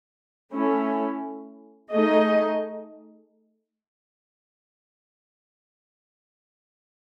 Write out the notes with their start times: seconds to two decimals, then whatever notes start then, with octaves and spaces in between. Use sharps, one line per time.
0.54 A3 C#4 E4
1.92 A3 D#4 G#4 D#5